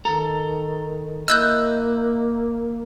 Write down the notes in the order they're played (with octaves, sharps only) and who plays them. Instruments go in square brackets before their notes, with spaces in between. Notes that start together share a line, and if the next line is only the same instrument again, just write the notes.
[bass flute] D#3 [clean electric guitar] A4 A#5
[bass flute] A#3 [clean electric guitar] E4 D#5 [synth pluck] E6 F#6 G6